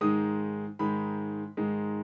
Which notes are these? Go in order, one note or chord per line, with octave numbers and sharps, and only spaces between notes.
G#2 D#3 G#3 D#6
G#2 D#3 G#3 B5
G#2 D#3 G#3